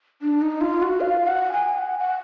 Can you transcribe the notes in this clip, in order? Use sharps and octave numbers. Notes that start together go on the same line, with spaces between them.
D4
D#4
F4
F#4
F5
F#5
G#5
F#5
F#5